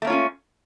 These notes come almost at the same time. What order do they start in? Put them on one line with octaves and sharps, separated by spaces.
A3 A#3 C#5 F4 C#4